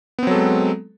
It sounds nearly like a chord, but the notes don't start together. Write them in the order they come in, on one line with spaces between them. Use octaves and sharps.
B3 C4 F#3 A4 G#3